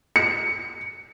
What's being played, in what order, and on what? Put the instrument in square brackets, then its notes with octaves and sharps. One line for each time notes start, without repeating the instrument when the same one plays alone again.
[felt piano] C#7